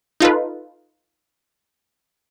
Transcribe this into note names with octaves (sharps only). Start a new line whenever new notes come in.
D#4 F4 A4 B4